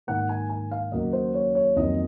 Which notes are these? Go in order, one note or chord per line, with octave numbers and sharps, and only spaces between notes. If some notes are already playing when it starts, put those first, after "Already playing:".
G#2 D#3 A#3 F#5
G#5
G#5
F5
D#2 C#3 F#3 A#3 D#5
C5
C#5
C#5
F2 D#3 F#3 A#3 D#5